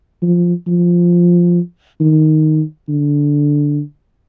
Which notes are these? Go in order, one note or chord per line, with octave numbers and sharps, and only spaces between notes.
F3
F3
D#3
D3